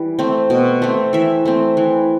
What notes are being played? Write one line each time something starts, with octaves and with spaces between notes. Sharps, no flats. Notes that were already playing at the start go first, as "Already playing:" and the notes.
Already playing: E3 G3
A3 C4
B2
A3 C4
E3 E5
A3 C4
E3